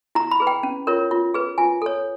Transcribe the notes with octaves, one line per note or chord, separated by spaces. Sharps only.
E4 A#5
B5
G#4 B4
G5
C#4
F4 A#4 C#5
F4
G#4 B4
F4 G#5
A4 C#5